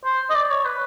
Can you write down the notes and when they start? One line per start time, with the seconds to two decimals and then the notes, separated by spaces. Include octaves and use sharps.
0.05 C5
0.30 D#5
0.35 D5
0.50 C#5
0.65 B4